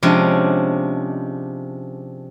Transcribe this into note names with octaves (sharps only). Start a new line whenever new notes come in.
C3 F3 G#3 C#4 D4